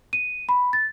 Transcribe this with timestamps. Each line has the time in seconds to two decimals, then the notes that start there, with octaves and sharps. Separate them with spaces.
0.13 D#7
0.49 B5
0.73 A6